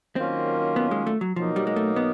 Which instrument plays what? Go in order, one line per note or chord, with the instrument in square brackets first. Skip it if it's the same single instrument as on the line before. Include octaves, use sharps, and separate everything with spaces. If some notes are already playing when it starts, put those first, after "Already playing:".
[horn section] D#3 F#3 A#3 C#4 F4 [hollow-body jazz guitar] C4
[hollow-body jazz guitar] B3
G#3
A3
F#3
[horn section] B2 F#3 A#3 D#4 [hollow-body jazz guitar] F3
[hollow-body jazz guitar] G3
G#3
A3
B3